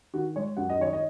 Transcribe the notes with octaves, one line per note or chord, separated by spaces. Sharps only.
D#3 F#4
G#3 C#5
F#2 F#5
D#5
D#3 C#5
D#5